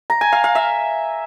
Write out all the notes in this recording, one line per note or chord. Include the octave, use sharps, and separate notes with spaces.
A#5
G#5
F5
F5
E5